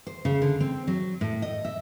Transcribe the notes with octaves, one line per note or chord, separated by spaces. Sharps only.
C5
C#3
D3
C4
F#3
A2
D#5
E5